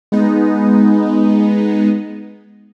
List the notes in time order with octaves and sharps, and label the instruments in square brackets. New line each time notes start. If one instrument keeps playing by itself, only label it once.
[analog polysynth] G#3 B3 D#4